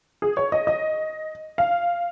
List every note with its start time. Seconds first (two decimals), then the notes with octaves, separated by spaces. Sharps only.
0.22 G#4
0.37 C#5
0.52 D#5
0.67 D#5
1.58 F5